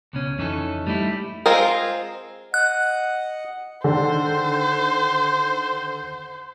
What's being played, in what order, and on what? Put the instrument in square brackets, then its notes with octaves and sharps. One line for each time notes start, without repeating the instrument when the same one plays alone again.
[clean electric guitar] C#2 B2 C#4
F2 E3 C#4 D#4 G4 A4
G3 A3 D#4 E4
[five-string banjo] G#3 C4 F4 G#4 A#4
[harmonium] D#5 F#5 [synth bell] F#6
[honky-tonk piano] D3 D#3 [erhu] C5